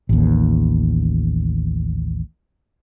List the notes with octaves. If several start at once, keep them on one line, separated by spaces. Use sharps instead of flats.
A1 D#2